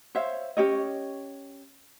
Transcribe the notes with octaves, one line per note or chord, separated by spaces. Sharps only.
C5 C#5 E5 F5
C#4 G4 C#5 D#5